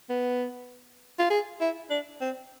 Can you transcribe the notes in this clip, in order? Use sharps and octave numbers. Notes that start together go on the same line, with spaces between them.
B3
F4
G#4
E4
D4
C4